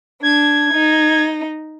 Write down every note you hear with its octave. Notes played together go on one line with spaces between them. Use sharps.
D4 G#6
D#4